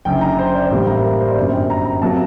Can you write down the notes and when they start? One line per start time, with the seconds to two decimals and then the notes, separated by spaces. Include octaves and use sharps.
0.05 F#1 F#2 D3 G5
0.21 A#5
0.39 C5
0.55 D5
0.70 A1 A2 G3 A#3 C5
0.87 A#4
1.04 A#4
1.20 C5
1.30 D5
1.36 G1 F#2 F#3 C5
1.53 G5
1.70 A#5
1.85 A#5
2.02 C3 F#3 A#3 A5